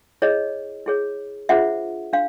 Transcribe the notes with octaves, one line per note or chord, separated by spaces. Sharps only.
E4 G#4 C#5 D#5
E4 G#4 C#5
D4 F4 G#4 C5 E5 F#5
D4 F5